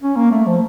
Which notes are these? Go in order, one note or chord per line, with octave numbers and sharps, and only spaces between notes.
C#4
A#3
A3
F3